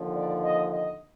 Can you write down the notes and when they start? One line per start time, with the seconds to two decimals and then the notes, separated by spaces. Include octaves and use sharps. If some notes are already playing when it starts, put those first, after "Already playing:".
Already playing: D#2 D3 F3
0.15 D5
0.43 D#5
0.72 D#5